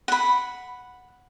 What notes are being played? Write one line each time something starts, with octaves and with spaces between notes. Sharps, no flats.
F#5 B5